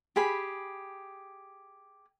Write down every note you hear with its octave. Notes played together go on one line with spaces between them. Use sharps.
G4 G#4 B5